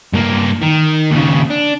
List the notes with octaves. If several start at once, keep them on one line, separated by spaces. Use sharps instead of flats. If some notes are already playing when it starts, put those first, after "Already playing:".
G2 A#3
D#3
D#2 C#3
D4